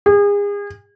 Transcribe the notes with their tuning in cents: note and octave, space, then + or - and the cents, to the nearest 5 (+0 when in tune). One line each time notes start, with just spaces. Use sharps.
G#4 -35